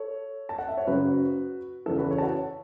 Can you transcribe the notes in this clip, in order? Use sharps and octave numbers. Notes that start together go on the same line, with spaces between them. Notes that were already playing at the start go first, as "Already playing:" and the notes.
Already playing: A4 C#5
A5
F#5
E5
C#5
F#1 F#2 C#3 F#4 B4
E2 C#3 E3 A4
F#4 B4
A4 C#5
A5
C#5 F#5